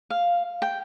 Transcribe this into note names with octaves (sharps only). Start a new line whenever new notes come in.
F5
G5